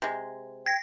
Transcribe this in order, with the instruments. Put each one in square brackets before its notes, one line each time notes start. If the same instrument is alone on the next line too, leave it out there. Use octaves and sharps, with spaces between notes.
[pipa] C3 G#3
[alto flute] G5 [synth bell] G#6 A#6